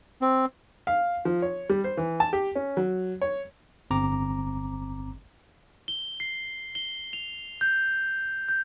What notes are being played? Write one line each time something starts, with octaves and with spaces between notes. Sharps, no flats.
C4
F5
F3
C#5
G3
C5
E3
A5
G4
C#4
F#3
C#5
G1 C4 A#5 D6
G7
C7
G7
F7
G6
G6